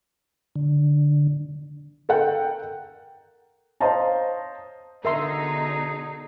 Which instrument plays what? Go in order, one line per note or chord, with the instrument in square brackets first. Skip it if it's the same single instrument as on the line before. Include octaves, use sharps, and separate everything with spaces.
[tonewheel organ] D3
[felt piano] A4 A#4 F#5 G5
[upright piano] C5 C#5 D#5 F5 A5 A#5
[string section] B2 D3 D#4 [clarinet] G#4 [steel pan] A#4 E5 C6